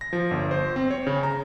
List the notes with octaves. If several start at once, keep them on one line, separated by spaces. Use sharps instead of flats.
A#6
F3
G1
C5
C4
C#5
C#3
A#5